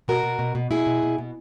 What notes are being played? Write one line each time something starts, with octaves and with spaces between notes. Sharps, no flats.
B2 F#4 A#4
B2
B2
B2
B2 E4 G#4
B2
B2
B2